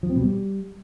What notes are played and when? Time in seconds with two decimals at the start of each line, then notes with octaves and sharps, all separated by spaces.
0.03 F3
0.10 C4
0.16 B2
0.22 G3